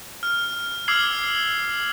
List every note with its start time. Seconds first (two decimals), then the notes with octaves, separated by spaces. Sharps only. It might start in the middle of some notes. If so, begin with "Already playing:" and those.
0.23 F6
0.88 D6 E6 F6 G#6 C7 F#7